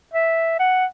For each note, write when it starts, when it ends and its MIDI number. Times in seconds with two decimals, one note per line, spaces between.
0.13 0.57 76
0.59 0.85 78